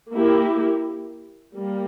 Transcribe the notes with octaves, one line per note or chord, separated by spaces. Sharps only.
A#3 E4 G4
G3 A#3